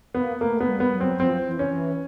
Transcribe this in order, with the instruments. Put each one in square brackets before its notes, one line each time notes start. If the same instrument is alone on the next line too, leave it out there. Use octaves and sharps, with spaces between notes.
[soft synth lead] A#3 [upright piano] B3
[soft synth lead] A3 [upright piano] A#3
[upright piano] B3
[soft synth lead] G3
[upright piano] B3
[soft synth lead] F#3
[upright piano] C4
[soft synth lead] F3 [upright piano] C4
[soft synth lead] E3
[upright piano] C#4
[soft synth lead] E3